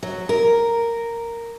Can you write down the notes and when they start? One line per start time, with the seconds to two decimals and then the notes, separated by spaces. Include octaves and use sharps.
0.03 F#3
0.29 A#4